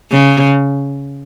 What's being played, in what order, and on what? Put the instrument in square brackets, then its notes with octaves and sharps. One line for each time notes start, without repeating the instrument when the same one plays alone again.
[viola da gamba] C#3